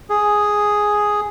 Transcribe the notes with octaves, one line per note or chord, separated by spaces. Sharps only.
G#4